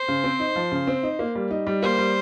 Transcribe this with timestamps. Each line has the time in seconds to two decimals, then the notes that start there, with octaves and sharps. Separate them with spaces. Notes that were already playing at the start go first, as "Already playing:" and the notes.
Already playing: C5
0.08 C#3
0.24 C4
0.40 D#4
0.56 F3
0.72 C#3
0.87 C4
1.03 D#4
1.19 A#3
1.35 G3
1.51 D#4
1.67 G3
1.82 A#3 C5
1.98 G3